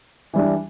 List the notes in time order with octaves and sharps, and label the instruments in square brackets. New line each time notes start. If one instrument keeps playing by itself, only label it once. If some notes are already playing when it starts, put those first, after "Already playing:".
[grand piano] E3 G3 D4